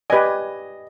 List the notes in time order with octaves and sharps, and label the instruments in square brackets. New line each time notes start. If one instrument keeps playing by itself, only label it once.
[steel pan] G4 B4 D5 G#5 [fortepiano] D#5